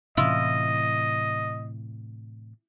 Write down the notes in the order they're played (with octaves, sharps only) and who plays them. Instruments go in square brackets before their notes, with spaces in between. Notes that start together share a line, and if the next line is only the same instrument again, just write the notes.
[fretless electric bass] A2 C3 E3 [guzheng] E4 F4 [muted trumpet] D#5